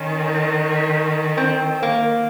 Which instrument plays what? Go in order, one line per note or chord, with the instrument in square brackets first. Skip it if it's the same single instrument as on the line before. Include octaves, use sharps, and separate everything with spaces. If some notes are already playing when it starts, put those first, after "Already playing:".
Already playing: [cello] D#3 [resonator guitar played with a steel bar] C#4
[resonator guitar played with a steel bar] C4
A#3